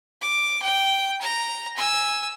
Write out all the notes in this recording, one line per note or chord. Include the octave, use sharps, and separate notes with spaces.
D6
G5
A#5
G#5 E6